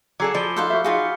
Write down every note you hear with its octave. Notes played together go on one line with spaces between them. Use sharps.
F#3 G#4 A4 D6 E6 C7
F3 D5 B5 G7
D#4 F#4 A4 C5 F5 E6 G6
F#4 E5
D#4 F4 F#4 G#4 F5 B6 C#7